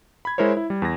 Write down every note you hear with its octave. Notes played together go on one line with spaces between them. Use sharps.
B5 G#6
G#3 E4 A#4 C5 C#5
E4
G3
E2 A#6